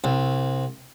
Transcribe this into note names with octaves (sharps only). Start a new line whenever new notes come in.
C2